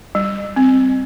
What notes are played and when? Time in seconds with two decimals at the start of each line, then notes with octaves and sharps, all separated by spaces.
0.15 G3
0.56 C4